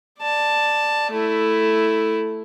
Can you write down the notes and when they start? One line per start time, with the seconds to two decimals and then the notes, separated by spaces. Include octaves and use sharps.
0.19 D5 A5
1.12 A3 E4